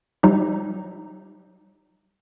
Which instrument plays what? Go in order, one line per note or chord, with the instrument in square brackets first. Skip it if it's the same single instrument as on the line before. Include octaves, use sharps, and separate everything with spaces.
[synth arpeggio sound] F#3 G3 D#4 F4 G4